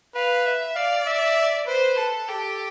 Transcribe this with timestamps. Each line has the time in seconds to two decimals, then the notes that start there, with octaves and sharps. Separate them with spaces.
0.15 B4 F5
0.46 E5
0.75 D5 F5
1.06 E5
1.67 B4 C5
1.98 A4
2.28 G4 A4